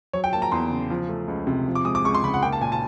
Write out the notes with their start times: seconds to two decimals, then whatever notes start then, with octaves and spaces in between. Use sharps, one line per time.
0.13 F#3 C#5
0.24 G5
0.33 A#3 A5
0.42 A#5
0.52 E2 C6
0.70 C#3
0.90 F3
1.09 A3
1.28 C#2
1.47 C3
1.66 F3
1.75 D6
1.85 G#3 D#6
1.95 D6
2.04 C#2 C#6
2.15 C6
2.24 C#3 B5
2.34 F#5
2.43 A#3 G5
2.52 A5
2.61 A#2 G#5
2.72 A5